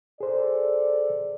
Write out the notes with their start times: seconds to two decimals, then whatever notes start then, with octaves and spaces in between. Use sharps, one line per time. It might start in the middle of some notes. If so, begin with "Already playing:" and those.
0.20 G#4 A4 C5 D5